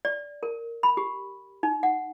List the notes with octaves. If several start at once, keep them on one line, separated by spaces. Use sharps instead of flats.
D5
A#4
B5
G4
D#4
F#5